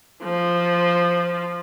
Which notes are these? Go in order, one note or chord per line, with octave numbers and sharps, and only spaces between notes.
F3